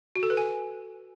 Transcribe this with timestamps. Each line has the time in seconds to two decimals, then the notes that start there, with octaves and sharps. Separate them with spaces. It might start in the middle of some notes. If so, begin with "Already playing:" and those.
0.16 F#4
0.23 A4
0.30 B4
0.37 G#5